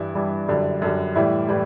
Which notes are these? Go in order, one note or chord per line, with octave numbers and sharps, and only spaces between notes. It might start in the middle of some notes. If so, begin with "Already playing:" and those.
Already playing: G2 E3 G3 E4
G2 E3 G3
F#2 D3 G3
F#2 D3 G3
A2 E3 G3 E4
A2 E3 G3